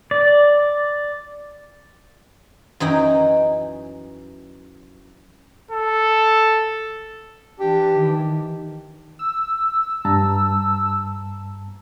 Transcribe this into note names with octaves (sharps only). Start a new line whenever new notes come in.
D5
F#2 E3 D#4 G5
A4
E3 D4 G4
D#3
E6
G2 A5 A#5